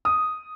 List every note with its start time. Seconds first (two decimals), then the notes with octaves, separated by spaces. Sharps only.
0.05 D#6